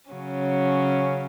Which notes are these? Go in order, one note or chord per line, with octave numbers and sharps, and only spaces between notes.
C#3 F#3 C#4